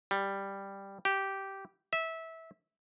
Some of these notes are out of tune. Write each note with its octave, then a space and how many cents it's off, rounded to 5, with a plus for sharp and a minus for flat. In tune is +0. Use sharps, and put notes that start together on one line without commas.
G3 +5
G4 -10
E5 -20